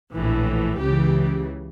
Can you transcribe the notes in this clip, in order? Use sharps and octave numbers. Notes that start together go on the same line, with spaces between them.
A#1 A2 E3
C#2 C#3 E3 G4